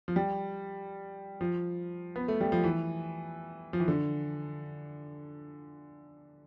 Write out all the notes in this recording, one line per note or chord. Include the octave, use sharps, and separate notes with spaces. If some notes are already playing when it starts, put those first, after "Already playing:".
F3
G3
F3
B3
A3
G3
F3
E3
F3
E3
D3